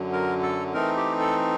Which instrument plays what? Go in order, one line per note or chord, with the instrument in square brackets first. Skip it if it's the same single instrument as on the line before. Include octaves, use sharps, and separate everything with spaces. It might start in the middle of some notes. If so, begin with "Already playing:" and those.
Already playing: [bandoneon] F#2 D3 F#3
A#4
A4
E3 A3 C4 D#4 A#4
G4
A4